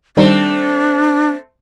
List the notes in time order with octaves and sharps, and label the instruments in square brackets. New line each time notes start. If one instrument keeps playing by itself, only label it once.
[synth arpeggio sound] D#3 G3 D#4 [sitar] A3 C4 [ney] D4